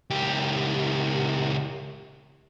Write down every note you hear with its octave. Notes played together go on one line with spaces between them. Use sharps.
C#2 G4